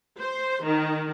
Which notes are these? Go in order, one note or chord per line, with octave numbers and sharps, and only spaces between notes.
C5
D#3